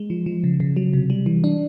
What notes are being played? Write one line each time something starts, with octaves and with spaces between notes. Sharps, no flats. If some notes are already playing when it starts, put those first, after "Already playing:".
Already playing: G#3
F3
F3
C#3
C#3
F#3
C3
G3
E3
D4